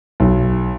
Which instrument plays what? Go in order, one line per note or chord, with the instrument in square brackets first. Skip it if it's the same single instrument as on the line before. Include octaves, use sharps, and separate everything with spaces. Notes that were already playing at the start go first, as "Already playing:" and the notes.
[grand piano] B1